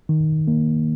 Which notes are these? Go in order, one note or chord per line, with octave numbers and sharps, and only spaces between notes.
D#3
A#3